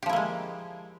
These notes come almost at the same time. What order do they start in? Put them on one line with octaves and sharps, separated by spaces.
G4 F3 E4 A#3 G#3